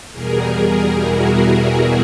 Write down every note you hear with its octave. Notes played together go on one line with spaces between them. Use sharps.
E2 B2 G3 G#4 A#4
E4 F#4